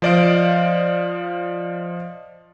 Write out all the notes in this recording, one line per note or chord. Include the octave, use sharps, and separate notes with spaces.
F3 C5 D5 D#5 F5 D7